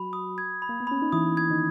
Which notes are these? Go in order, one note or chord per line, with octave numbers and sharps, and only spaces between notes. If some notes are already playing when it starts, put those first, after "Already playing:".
Already playing: F#3 F#4 B5
D#6
G#6
B5
A#3
B3
C#4 B5
D#4
E3 E4 D#6
G#6
D#3 D#4